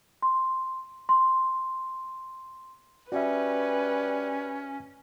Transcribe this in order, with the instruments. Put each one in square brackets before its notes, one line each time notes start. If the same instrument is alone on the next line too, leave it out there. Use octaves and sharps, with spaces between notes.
[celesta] C6
C6
[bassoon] G3 [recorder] C#4 [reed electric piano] F#4 E5 [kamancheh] B4